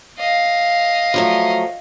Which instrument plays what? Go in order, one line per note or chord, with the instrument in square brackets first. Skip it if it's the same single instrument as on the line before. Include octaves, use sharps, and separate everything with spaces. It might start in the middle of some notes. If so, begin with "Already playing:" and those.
[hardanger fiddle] D#5 F5
[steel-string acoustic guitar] F3 F#3 A3